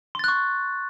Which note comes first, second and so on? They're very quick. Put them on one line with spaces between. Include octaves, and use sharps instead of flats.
C6 A6 F#6 C#6